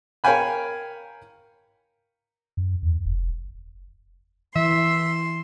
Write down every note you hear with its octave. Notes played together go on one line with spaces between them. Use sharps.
A#4 C#5 F5 G5 G#5 B5
F#2
E2
F1
E3 E5 C6